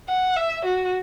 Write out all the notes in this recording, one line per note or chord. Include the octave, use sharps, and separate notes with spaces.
F#5
E5
F#4